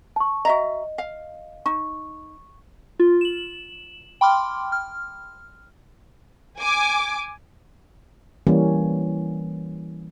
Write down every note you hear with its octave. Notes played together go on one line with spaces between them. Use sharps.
A5 C#6
F#4 D#5 E5 A#5
F5
D#4 C#6
F4
E7 F#7
G5 B5 C6 D6 F6
F6
G#5 D6
E3 G3 A#3 C#4